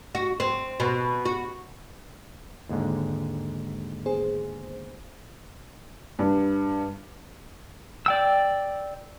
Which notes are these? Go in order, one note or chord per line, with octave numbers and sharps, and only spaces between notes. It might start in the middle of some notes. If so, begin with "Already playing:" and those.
F#4
C4
B2
F#4
D#2 G#2 D3
B3 G#4 C5
G2
D5 G5 E6